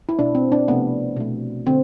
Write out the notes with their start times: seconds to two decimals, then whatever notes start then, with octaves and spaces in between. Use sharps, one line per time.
0.09 E4
0.18 B2 A3 D4
0.35 C4
0.52 D4
0.68 C3 F3 A3 B3
1.16 B2 A3
1.66 D3 C4